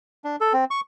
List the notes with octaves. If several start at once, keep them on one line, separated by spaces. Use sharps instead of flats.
D4
A4
C4
C#6